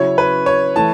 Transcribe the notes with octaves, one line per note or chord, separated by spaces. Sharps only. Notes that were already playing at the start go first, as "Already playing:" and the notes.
Already playing: C#3 F#3 C#4 E4 C#5
B4
C#5
E3 A3 E4 A5